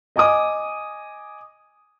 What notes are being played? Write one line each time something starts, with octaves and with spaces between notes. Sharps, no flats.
D#5 G#5 D6 D#6